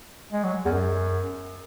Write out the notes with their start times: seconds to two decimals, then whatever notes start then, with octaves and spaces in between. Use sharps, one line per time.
0.32 G#3
0.44 F#3
0.66 E2
0.69 F#2